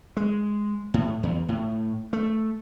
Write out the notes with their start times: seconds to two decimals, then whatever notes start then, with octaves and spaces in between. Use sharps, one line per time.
0.17 G#3
0.94 A2
1.23 E2
1.49 A2
2.13 A3